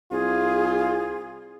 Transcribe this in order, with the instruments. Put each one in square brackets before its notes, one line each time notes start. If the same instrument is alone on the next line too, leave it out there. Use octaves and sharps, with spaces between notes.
[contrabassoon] C2 [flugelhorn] F4 [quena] G#4